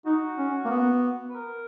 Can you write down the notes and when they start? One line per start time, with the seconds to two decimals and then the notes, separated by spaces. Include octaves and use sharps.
0.06 D#4 F#4
0.39 C#4
0.65 A#3
0.70 B3
1.29 B4
1.35 A#4